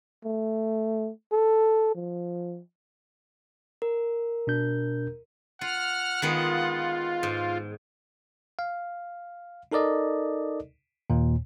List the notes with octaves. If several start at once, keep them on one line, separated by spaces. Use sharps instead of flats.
A3
A4
F3
A#4
B2 D4 G6
F4 F#5 F6
D#3 G#3 B3 F4
G#2
F5
D#4 A4 A#4 D5 D#5
D#2 A#2